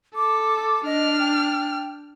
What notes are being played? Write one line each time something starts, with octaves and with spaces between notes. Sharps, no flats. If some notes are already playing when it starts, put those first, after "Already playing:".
A4 D6
D4 D#5 F6
G5